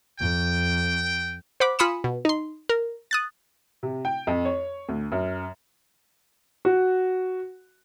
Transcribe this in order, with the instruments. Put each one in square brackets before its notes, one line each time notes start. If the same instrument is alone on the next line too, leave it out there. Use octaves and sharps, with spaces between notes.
[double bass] F2 [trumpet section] G5
[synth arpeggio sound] C5 F#5 B5 D6
F4 G#5 B5 D#6 C#7 E7
B2
D#4 C6
A#4
D#6 F#6 A6
[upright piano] C3
G5
F2
C#5
D2
F#2
[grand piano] F#4